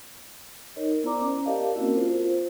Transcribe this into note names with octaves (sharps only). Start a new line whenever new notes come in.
D#4 A#4 C#5 D#5
B3 E4 C5 D5 A#5 D6
C#4
G4 A#4 D5 D#5 F5 A5
A#3 C4 C#4 E4 F#4 A#4
F4 C5